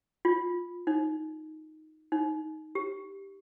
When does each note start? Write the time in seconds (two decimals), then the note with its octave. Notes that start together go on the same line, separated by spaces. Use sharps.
0.25 F4
0.87 D#4
2.12 D#4
2.75 G4